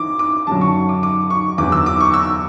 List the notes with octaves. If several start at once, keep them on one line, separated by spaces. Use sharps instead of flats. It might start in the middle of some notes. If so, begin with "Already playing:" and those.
Already playing: E3 D6
D6
F#2 D3 F#3 A5
C#6
C#6
D6
D6
C#6
E2 D3 F#3 D6
E6
D6
C#6
E6